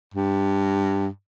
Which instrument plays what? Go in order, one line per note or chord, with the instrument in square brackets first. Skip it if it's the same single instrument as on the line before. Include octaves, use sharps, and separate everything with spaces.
[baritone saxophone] G2